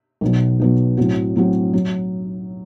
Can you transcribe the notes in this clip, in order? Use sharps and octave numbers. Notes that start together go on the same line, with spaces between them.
B1 B2 F#3
B1 B2 F#3
A2 F#3 C4 F#4
A2 F#3 C4 F#4
F#3